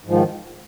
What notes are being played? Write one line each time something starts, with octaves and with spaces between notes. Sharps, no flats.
G#2 D#3 F3